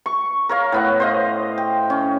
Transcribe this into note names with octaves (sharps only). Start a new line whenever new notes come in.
C#6
A#4 C#5 F5
A2 B3 F#5
C5 D#5 F5
G5
C#4